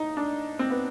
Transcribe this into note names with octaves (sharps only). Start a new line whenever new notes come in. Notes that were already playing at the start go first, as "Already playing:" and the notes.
Already playing: A2 D#4
D4
C4
B3